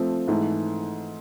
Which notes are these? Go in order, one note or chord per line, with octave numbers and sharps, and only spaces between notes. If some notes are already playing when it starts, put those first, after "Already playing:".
Already playing: F3 A3 C4
G#2 E3 A3